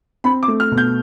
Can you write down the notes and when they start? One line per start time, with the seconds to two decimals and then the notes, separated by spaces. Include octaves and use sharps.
0.24 C4 B5
0.43 D6
0.48 A3
0.60 F6
0.72 B2
0.77 G6